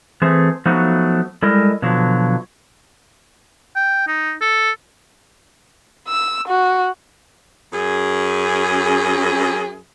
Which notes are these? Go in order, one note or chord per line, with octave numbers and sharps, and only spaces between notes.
E3 A3 C4 G#4
F3 F#3 A3 B3 D#4 F#4
G3 G#3 E4 A4 A#4 D#5
B2 D3 F3 F#3
G5
D#4
A4
E6
F#4
F#2 G#4